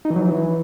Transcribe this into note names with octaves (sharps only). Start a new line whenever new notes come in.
D#4
E3
F#3
E3